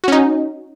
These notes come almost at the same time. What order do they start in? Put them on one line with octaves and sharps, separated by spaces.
F#4 C#4 D#4